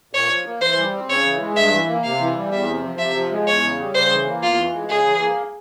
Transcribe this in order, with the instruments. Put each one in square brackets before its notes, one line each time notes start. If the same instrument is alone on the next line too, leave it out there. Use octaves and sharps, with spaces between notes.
[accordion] A#2 [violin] C#5
[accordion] F3
A#3
[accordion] E3 [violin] C5
[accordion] G3
C4
[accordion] C#3 [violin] C#5
[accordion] E3
G#3
[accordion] G2 [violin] E5
[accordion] E3
A#3
[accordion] C3 [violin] F5
[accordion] E3
G3
[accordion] E2 [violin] E5
[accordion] C3
F3
[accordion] C3 [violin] E5
[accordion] F3
G#3
[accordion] E2 [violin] C#5
[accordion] C#3
G3
[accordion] C#3 [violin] C5
[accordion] E3
A#3
[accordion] E2 [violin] F4
[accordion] E3
G#3
[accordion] C#3 [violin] G#4
[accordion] E3
A#3